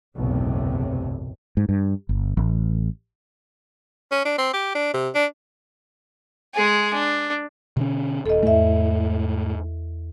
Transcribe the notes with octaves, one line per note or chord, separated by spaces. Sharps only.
F#1 B1 E2 A2 C3
G#2
G2
G1
A1
C#4
D4
C4
G4
D4
C3
D4
G#3 G#4
D4
B2 D3 C#4
D#1 A4 D#5
E2 G#2 A3 E5